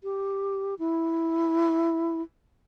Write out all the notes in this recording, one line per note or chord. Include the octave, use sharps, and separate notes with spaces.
G4
E4